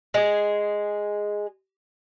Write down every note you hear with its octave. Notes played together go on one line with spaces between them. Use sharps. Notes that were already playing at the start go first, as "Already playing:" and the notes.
G#3 G#4